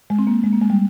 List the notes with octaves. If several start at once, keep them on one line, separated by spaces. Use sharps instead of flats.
G#3
C4
A#3
G#3
A#3
G#3
G3